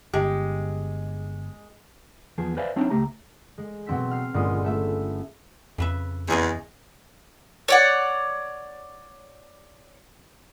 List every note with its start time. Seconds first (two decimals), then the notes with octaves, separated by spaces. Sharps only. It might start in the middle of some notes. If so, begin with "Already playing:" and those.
0.14 G1 G#3 G4
2.38 E2 F3 B3 G#4
2.57 B4 C5 D5 E5 F5 G#5
2.76 F#3 C4 D4 D#4 C#5 E5
2.90 C#2 A3 G4 A#5
3.58 G#3
3.86 B2 F#3 C4 E6 B6
4.11 F6 C7
4.34 G1 A#2 G#3 C#4 C6 D#6
4.64 A3 E5
5.78 F2 C#3 B4 E5
6.28 E2 E3 G#4 D#5
7.68 C#5 D5 F#5